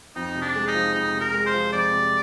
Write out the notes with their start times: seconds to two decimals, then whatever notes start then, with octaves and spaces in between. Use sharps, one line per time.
0.16 F2 D#4
0.35 C3
0.42 D4
0.56 G#3
0.68 D#4
0.74 F3
0.95 F2 D#4
1.14 C3
1.21 A#4
1.33 G#3
1.46 C5
1.54 F3
1.73 F2 D5
1.92 C3